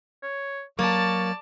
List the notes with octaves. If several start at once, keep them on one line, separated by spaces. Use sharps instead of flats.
C#5
F#3 A#3 D5 A5 C#6